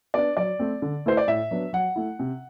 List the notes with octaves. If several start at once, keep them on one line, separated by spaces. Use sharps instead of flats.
B3 D4 D5
F#3 D5
A3 C4
D3
A3 E4 C5
D5
A2 E5
F#3 B3 D4
F#3 F#5
A3 E4
C3